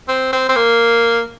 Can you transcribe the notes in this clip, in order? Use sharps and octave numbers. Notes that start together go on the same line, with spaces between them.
C4
C4
C4
A#3